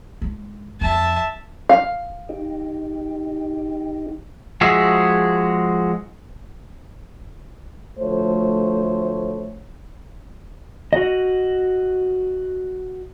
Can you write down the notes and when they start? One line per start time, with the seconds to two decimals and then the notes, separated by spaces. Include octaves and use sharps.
0.22 G#2
0.81 F2 E5 A5
1.69 F5
2.29 D#4 G4
4.61 F3 G#3 F#4 G#4 E5
7.99 D2 F3 A3 C5 C#5
10.93 F#4 D#5